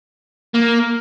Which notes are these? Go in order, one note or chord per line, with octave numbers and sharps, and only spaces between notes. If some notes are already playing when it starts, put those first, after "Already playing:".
A#3